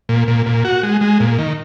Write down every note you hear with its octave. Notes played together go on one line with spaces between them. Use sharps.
A#2
A#2
A#2
F#4
G#3
G#3
A#2
D#3